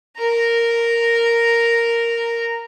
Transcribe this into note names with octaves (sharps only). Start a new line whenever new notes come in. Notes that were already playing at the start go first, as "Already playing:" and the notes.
A#4 A#5